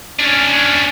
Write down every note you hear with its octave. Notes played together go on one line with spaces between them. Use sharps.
C#4 D4